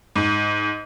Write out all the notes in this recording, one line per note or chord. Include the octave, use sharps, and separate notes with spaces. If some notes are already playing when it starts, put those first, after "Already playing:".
G#2